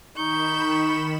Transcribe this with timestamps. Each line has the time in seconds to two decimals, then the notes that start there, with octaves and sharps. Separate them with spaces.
0.18 D#3 D#4 B5 C#6 G6 E7